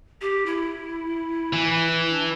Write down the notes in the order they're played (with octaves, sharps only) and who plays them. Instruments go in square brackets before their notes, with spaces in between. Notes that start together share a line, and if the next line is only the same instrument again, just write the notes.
[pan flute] G4
E4
[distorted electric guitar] E3
[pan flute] D4